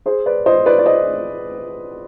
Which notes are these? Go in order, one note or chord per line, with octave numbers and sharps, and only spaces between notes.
G#4 C5
B4 D5
C5 D#5
B4 D5
D5
C5 D#5